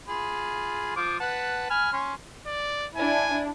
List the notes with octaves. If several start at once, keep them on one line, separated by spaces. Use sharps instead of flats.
F4 G#4 B5
F3 F4 D6
B4 F#5 A5
G#5 B5 F6
C#4 C6
D5
D4 E4 G#5